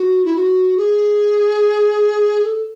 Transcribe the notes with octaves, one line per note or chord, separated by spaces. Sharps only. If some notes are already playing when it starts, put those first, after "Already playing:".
Already playing: F#4
E4
F#4
G#4
A4